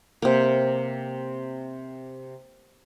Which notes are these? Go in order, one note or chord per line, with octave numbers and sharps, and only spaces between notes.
C3 A#3